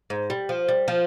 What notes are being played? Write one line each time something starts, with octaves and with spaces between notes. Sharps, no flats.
G#2
G3
F3
G3
F3